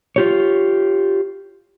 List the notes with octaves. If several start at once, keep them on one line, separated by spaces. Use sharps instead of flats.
F4 G4 C#5